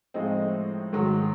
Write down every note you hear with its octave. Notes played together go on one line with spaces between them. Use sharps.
A2 F3 G#3 C4 D#4
G#2 D#3 F#3